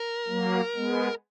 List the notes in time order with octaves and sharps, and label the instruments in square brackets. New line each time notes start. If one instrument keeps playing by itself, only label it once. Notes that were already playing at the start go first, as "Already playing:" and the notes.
Already playing: [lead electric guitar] A#4
[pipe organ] F#3 A#3
G#3 B3